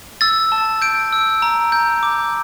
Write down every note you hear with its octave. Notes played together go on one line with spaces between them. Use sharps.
E6 A6
A5
G6 D7
E6
A#5
G6
D6